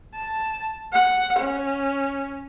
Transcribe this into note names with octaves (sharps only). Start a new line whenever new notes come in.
A5
F#5
C#4